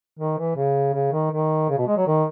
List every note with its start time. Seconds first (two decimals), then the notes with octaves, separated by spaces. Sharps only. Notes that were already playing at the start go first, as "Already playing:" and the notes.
0.19 D#3
0.38 E3
0.56 C#3
0.93 C#3
1.12 D#3
1.32 D#3
1.69 C#3
1.78 B2
1.87 G#3
1.97 F#3
2.07 D#3